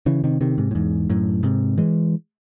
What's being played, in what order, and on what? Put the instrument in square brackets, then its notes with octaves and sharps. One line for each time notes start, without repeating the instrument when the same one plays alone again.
[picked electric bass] C#3 E3
C3 D#3
C3 D#3
G#2 C3
A2
E2 G#2
F#2 A2
G#2 C3
E3 G#3